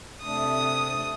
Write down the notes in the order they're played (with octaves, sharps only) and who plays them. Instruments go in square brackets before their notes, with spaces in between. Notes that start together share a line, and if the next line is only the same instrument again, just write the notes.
[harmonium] C3 A3 D4 [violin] D#6